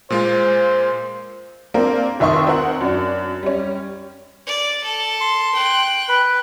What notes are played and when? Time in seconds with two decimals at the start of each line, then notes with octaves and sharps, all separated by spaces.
0.10 A#2 G#3 F4 C5
1.74 A#3 C4 D4 A#4
2.20 F1 D#3 E5 C6 C#6 D#6
2.47 C4 A#4 F#5
2.81 F#2 D4
3.43 G3 C#4
4.47 D5
4.83 A4
5.21 C6
5.54 G5 F#6
6.09 B4